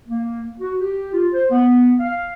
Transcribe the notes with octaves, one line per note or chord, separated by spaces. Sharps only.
A#3
F#4
G4
F4
C5
B3
F5